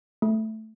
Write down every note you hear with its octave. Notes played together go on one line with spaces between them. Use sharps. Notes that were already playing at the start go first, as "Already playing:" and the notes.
A3